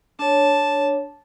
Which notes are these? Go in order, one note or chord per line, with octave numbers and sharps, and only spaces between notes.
D4 C#5 A5